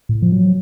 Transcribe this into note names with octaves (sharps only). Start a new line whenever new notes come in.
A2
F3
F#3